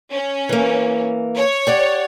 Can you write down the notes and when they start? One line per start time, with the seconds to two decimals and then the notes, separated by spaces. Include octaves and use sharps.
0.12 C#4
0.49 E3 A#3
1.36 C#5
1.67 G4 D5 F#5